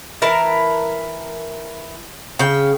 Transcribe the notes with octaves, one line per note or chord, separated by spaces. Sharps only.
E3 E4 A#4 A5
C#3 G5